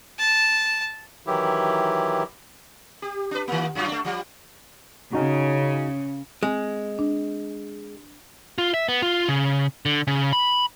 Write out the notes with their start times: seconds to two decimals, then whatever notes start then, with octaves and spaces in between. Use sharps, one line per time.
0.19 A5
1.27 D#3 E3 F#3 E4 G4
3.02 G4
3.31 D4 B4
3.48 D#3 A#3
3.75 F#2 F#3 F4
3.88 A3 D4
4.05 F3 G3
5.13 C#3 C#4 D#4 F#4
6.43 G#3 C4
6.99 D4
8.58 F4
8.74 E5
8.89 B3
9.02 F4
9.29 C#3
9.85 D3
10.07 C#3
10.33 B5